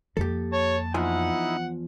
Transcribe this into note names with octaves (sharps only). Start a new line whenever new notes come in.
F2 A#3 G4 A4
C#5 A5
E2 F3 D#4 E4 F#5 G#5